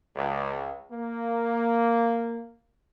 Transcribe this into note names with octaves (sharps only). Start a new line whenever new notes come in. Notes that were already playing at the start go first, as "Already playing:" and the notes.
C#2
A#3